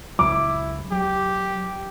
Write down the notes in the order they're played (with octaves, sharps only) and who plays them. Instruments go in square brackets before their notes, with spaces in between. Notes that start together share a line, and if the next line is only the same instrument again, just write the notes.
[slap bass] C#2 F#3 [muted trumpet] E4 [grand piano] D6
[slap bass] F#3 [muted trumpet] G4